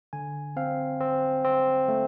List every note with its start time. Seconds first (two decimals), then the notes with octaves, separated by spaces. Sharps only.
0.13 D3 G#5
0.57 C4 F5
1.01 C4
1.45 C4
1.88 A3